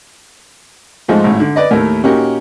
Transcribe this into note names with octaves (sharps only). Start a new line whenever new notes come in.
G#2 F3 G#3 A3 D#4
G#1 A2
D3
B4 D5 D#5
D#2 A2 A3 A#4
A#2 C#4 D#4 F#4 G4 A#4